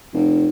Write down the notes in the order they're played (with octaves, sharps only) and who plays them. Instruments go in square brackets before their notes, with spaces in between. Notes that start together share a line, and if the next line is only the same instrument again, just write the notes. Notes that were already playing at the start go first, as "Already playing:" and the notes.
[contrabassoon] F1